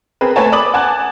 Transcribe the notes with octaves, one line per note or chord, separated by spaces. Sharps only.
C4 G#4 A#4 B4
A3 A4 B4 C#5 G#5 A5
D5 B5 D6 D#6 F#7
F#5 G#5 A5 D6 F#6